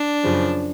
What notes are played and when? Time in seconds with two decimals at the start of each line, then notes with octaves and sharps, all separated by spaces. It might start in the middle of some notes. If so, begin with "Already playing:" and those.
Already playing: D4
0.23 F#2 C#3 F3